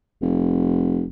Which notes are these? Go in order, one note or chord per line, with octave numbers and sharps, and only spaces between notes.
F1